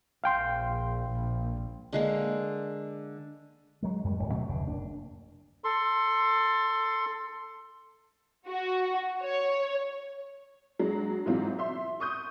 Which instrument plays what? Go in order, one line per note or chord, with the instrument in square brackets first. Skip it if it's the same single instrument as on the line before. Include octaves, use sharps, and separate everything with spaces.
[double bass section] A#1 [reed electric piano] F5 G5 C6
[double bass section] A#1
[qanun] D3 G#3 A#3
[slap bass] F#3 G#3
F#2 G3 G#3
D1 D#2 A2
B2 F#3 A3
F1 D2 G2 D3
F#1 D4
[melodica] A4 C6
[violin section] F#4
C#5
[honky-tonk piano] G2 F#3 G#3
G#2 B2 E3 F#3 C4 F4
E5 C6
C#6 D#6 G6